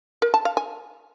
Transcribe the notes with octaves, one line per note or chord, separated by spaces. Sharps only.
A#4
A5
F5
G#5